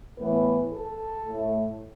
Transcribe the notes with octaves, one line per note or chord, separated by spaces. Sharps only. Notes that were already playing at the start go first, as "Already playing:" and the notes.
A2 E3 B3 B4
A4
A2 A3